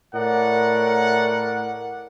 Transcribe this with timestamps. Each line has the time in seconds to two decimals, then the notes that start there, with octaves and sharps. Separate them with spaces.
0.15 A2 A#4 D5 F#5